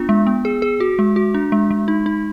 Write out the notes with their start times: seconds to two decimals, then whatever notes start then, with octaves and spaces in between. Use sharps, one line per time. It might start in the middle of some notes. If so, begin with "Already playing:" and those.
Already playing: B3 D4 F4
0.09 G#3
0.27 B3
0.45 G#4
0.62 G#4
0.80 F#4
0.99 G#3
1.16 F#4
1.34 D4
1.52 G#3
1.71 G#3
1.88 D#4
2.06 D#4